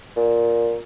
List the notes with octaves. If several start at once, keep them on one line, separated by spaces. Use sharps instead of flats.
A#2